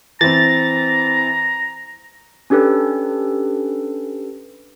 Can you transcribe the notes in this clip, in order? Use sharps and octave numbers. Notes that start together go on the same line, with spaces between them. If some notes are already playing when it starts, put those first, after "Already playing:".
E3 C4 A#5 A6
C#4 D4 G4 A4 B4